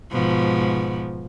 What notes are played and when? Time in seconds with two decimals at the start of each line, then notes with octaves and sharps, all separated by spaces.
0.12 G#2 B2 F3